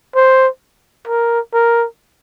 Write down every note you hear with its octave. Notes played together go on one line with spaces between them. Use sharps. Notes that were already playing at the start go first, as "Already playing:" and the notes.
C5
A#4
A#4